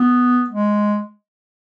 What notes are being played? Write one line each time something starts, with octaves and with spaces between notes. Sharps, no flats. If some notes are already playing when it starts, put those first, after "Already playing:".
Already playing: B3
G#3